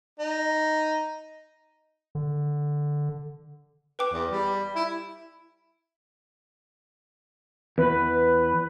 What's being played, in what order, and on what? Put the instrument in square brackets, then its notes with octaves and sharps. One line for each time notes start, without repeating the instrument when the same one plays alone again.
[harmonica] D#4
[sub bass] D3
[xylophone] B4 G5 D6
[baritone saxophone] E2
G3
E4
[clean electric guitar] E2 [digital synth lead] B4